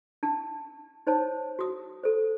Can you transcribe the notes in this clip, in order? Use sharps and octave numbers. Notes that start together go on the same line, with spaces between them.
D4 A5
D#4 C5 C#5 A5
F#4 D#6
A4 C5